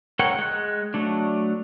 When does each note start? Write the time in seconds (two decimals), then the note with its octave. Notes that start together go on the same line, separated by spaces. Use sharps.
0.19 A4 A#4 C#5 F#5 G5
0.39 G#3 F#6
0.94 F#3 A3 D4